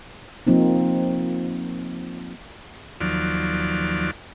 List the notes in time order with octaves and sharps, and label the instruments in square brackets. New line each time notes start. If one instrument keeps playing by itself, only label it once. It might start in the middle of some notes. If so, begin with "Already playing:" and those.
[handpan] F3 A#3 C4 D#4
[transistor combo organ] D#2 F3 F#3 D5